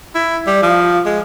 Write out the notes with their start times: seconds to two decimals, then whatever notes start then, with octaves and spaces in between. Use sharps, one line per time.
0.15 E4
0.47 G3
0.62 F3
1.06 G#3